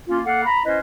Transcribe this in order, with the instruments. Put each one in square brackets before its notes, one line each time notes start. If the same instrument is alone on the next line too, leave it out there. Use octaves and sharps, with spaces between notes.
[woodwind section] A#3 C#4 F4
A#3 A4 F5 F#5
A#5 B5
C#4 E4 B4 C5 D#5